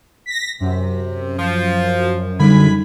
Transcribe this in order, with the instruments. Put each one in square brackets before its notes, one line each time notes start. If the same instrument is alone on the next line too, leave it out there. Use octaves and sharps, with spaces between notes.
[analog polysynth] A#6 B6
[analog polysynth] F#2 [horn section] C3
[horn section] F3
[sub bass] D3 [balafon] G3 D#4 [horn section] G#3 G#5 B5